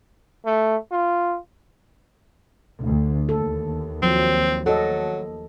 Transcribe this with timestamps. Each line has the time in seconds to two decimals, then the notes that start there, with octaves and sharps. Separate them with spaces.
0.45 A3
0.91 F4
2.80 D2
3.29 D#2 A4
4.02 F3 F#3 C4
4.66 F#3 A4 D#5